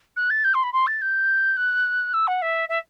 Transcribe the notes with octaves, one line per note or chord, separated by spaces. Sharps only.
F#6
A6
G6
C6
B5
C6
A6
G6
F#6
E6
F#5
E5
E5